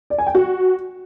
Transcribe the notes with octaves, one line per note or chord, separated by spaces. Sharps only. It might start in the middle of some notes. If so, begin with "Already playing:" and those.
D5
G#5
G5
F#4